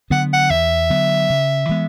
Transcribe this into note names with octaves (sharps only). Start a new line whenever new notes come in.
D3 F#3 B3 F#5
F#5
E2 E5
D3 F#3 B3
C#3
E3 G#3 B3